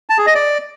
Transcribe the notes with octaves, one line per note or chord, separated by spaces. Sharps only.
A5
G#4
D#5
D5